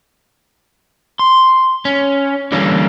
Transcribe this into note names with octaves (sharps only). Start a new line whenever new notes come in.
C6
C#4
D3 E3 G3 A#3 C#4 D4